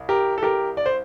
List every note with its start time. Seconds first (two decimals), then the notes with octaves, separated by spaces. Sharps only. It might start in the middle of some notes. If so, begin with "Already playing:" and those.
Already playing: C2
0.09 G4 A#4
0.38 A4
0.43 G4 A#4
0.77 D5
0.86 C5